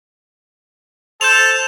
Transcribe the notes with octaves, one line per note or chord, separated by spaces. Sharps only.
A4 C5 A5 G6 E7 F7